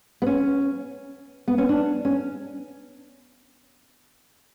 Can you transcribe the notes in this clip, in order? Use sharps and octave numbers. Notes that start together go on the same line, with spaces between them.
B3
C#4
B3
C#4
D4
C#4